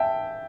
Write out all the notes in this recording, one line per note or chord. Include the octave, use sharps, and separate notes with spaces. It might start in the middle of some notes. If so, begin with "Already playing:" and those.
Already playing: E5 G5 A5